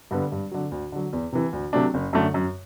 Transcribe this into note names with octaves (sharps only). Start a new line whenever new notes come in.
G2 D3 G3 B3
G2
D3 F#3
D2
D3 F#3
E2
C3 E3
D2
C3 F#3 A3 D4
F#1
F#2 D3 A3
F#2